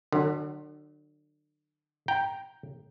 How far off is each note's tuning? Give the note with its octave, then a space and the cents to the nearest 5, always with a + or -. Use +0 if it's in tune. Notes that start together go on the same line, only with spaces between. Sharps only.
D3 +35 F#3 +0
G5 +0 A#5 +0